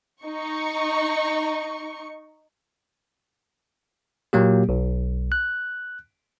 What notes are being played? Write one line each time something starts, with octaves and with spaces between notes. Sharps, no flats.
D#4 C#6
A#2 F#3 A#3 G4
B1
F#6